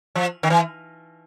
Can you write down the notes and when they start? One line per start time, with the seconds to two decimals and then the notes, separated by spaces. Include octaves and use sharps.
0.15 F3
0.43 D#3
0.50 E3